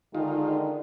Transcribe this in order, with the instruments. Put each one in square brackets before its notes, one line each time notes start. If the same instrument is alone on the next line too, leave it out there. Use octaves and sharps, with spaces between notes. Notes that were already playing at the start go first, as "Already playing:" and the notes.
[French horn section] D3 D#3 G#3 [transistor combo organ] D#4 F4